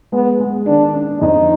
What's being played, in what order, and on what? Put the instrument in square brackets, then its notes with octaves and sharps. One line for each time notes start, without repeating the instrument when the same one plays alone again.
[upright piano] G#3 [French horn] B3
[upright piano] G#3
[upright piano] D#3 [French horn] D4
[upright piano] D4
[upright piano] F2 [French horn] D#4